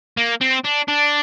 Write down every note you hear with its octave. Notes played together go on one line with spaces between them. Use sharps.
A#3
C4
D4
D4